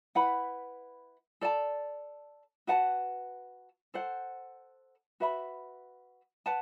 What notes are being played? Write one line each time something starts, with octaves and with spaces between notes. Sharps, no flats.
E4 B4 F#5 B5
A4 D5 A5
F#4 B4 F#5 A5
A4 C5 F#5
F#4 B4 E5 B5
B4 F#5 A5